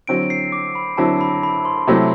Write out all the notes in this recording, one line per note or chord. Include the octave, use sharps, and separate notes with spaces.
D3 F#3 C4 E4 D7
C7
D6
B5
D3 F#3 C4 E4 A5
B5
B5
C6
C3 F#3 A3 C4 E4